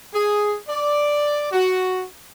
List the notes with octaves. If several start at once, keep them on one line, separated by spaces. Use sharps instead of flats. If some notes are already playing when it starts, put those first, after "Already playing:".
G#4
D5
F#4